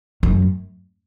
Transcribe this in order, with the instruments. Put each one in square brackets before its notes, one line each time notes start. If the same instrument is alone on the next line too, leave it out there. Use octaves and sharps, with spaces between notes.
[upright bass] F#2